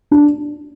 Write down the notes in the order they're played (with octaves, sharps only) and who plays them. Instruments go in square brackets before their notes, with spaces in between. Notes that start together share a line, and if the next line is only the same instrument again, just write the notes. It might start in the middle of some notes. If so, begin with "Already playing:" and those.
[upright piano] D4